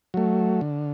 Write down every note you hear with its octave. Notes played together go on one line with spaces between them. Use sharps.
F#3 A3
D3